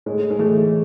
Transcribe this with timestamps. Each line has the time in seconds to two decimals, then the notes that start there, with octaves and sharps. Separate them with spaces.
0.06 A2 G#3
0.30 G#3
0.39 E3 A3